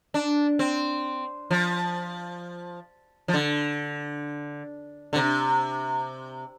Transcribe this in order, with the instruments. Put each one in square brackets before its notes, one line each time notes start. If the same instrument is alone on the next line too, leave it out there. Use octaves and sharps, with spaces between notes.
[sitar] D4
C4
F3
F3
D3
D3
C3